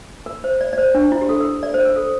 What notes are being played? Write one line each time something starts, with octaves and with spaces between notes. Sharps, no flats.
A#4
C5
D5
D5
C5
D4
E4
G4
A4
A#4
D5
C5
A#4
A4